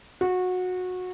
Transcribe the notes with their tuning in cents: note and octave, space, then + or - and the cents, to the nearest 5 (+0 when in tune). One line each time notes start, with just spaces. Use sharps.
F#4 -20